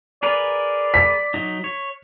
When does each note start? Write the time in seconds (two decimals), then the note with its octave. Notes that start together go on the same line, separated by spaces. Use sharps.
0.23 G#4 A#4 B4 D5
0.94 B6
1.34 F#3 D#4
1.64 C#5